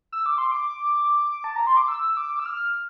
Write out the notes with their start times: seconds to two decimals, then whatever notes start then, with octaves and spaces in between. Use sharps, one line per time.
0.12 E6
0.26 D6
0.38 C6
0.52 D6
1.44 A5
1.56 A#5
1.67 C6
1.77 D6
1.88 E6
2.17 D6
2.39 E6
2.46 F6